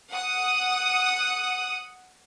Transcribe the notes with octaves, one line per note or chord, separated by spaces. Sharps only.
F#5 D#6